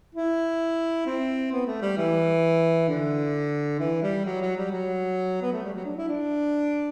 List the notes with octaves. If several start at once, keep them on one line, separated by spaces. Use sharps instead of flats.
E4
C4
B3
A3
G3
E3
D3
E3
G3
F#3
F#3
G3
F#3
B3
A3
G3
F#3
D4
E4
D4